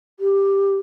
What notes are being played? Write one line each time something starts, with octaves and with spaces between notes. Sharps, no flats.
G4